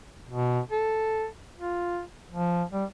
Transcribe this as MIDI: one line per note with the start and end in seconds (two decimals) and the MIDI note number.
0.29 0.60 47
0.71 1.26 69
1.58 2.02 65
2.30 2.64 53
2.73 2.85 55